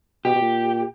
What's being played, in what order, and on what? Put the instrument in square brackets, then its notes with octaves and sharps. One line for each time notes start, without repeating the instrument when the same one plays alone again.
[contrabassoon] B2 [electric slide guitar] G4
[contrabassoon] B2
A#2